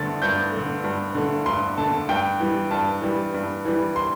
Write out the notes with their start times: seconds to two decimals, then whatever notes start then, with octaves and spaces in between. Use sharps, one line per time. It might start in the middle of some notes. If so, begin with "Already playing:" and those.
Already playing: G2 D3 A3 A6
0.22 G2 G6
0.52 D3 A3
0.84 G2
1.15 D3 A3
1.46 G2 C6
1.77 D3 A3 A5
2.09 G2 G5
2.40 E3 G3
2.71 G2 A5
3.02 E3 G3
3.34 G2
3.65 E3 G3
3.96 C6